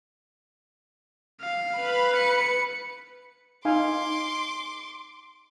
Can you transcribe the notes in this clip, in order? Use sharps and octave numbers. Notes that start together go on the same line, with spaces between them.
F5
B4 B5
C#7
D#4 F5 G#5 C6 D6